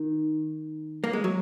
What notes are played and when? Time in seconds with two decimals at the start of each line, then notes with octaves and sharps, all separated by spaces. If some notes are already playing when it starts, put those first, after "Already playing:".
Already playing: D#3
1.04 A#3
1.13 G#3
1.24 F#3